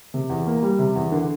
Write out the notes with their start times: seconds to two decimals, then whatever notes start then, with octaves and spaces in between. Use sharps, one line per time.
0.14 C3
0.30 E2
0.47 A#3
0.63 G3
0.79 C3
0.96 E2
1.12 D3